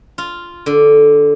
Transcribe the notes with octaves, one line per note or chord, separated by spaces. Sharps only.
F4
D3